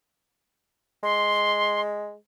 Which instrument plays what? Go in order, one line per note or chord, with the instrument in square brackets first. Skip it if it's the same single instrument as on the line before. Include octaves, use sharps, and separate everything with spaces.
[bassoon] G#3 [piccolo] C6